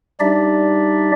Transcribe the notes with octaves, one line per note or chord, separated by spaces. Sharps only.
G3 D4 D#4 G4 D5 E5